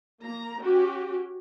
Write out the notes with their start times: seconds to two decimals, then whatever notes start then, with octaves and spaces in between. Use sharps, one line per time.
0.23 A#3 A#5
0.62 C#4 F#4 G4